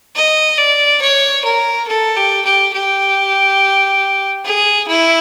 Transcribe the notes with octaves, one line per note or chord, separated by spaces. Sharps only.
D#5
D5
C#5
A#4
A4
G4
G4
G4
G#4
E4